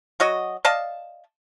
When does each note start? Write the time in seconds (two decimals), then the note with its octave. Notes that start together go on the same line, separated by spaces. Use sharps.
0.20 F#3 F#4 D#5
0.65 D5 D#5 F5 A5